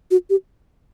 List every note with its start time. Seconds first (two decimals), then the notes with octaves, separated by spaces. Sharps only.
0.11 F#4
0.30 G4